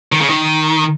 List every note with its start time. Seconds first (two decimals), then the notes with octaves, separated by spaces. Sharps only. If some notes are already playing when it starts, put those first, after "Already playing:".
0.12 D#3
0.21 C#3
0.30 D#3